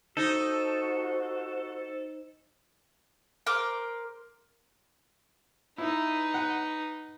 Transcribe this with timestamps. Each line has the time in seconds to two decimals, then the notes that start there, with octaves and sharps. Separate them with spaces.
0.17 D#4 F#4 A4 C5
3.47 A#4 C5 D6
5.78 D#4 E4 B4
6.34 F#5